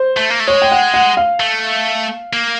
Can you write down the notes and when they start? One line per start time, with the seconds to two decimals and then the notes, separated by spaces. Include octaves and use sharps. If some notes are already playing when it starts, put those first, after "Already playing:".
Already playing: C5
0.17 A3
0.30 A#3
0.40 A3
0.48 G#3 C#5
0.62 G5
0.72 F#5
0.94 F#5
1.17 F5
1.40 A3
2.33 A#3